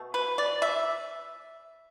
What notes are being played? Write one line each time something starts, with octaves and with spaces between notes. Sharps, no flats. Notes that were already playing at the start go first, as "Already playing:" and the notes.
Already playing: B2 A3
B4
D5
E5